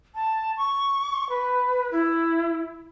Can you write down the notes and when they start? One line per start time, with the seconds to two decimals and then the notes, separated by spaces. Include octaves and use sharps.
0.15 A5
0.57 C#6
1.29 B4
1.92 E4